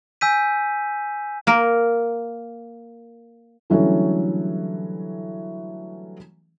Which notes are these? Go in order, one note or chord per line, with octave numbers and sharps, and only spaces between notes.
G#5 E6 G6 B6 D#7
A#3 A#4
D3 E3 F#3 G3 A3 C#4